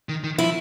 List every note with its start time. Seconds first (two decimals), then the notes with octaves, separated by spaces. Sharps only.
0.09 D#3
0.24 D#3
0.38 F3 E4